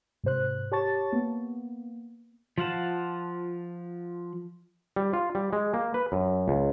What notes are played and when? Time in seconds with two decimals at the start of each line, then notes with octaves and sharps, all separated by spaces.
0.24 G#2 C3 C5 F#6
0.72 G4 C#5 A5 C#6 A6
1.13 A#3 B3
2.58 F3 F4 F5 F#5 A5
4.96 G3
5.13 F4
5.35 G3
5.53 G#3
5.74 A#3
5.94 B4
6.12 F#2
6.48 C#2